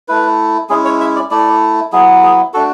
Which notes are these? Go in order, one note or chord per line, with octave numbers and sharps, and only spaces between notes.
A3 E4 B4
G#3 C#4 E4 G#4
C#5
E5
D5
A3 E4 D5
F#3 B3 E4 G#4
G#4
A3 D4 F#4 A4